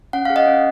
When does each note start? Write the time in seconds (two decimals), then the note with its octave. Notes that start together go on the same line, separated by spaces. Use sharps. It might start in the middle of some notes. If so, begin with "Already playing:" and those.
0.13 C#4 F#5
0.25 G#4 F5
0.36 D#5 F#5
0.46 C#4